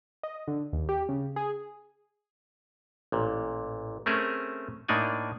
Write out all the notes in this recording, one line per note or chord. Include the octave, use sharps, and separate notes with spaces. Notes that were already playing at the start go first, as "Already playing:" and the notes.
D#5
D3
D#2
G4
C#3
G#4
A1 A#2
A3 C4 C#4 G#4 A#4 E5
A2 A#3 D4 D#4 D5 G#5